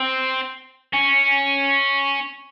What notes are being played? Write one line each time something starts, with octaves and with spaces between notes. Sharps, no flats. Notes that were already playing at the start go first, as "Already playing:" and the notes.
Already playing: C4
C#4